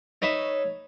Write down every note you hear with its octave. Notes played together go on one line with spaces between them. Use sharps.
D#4 B4 C#5 E5